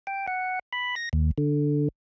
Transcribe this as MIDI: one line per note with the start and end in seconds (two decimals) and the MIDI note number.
0.07 0.26 79
0.28 0.59 78
0.73 0.95 83
0.96 1.09 94
1.13 1.31 39
1.38 1.89 50